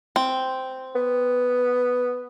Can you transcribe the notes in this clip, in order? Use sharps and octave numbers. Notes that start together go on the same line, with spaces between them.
C4
B3